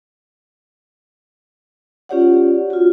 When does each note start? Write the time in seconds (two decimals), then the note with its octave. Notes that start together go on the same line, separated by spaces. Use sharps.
2.09 C#4 F4 G4 C#5 D5 F#5
2.70 F4 F#4